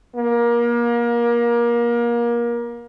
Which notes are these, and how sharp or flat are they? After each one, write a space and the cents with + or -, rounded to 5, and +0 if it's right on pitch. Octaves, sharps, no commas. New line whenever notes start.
A#3 +30